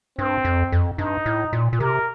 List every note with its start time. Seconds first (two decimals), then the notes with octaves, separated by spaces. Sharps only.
0.18 G2 C4
0.45 F2
0.72 F2
0.98 G2 D#4
1.26 A2
1.53 A#2
1.73 A#2
1.79 C3 A#4